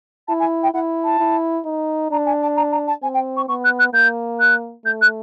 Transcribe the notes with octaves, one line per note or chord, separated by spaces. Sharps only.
E4 A5
G#5
G5
E4 F#5
A5
E4
D#4
D4 A#5
G#5
A5
A#5
A#5
A5
C4 G#5
G5
C#6
B3 C#6
F#6
F#6
A#3 G6
F#6
A3 G6
F#6